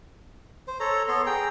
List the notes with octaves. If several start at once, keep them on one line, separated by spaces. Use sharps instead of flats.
C5
A4 C#5 A#5
B3 A4 C#5 C6
G#4 G5 A#5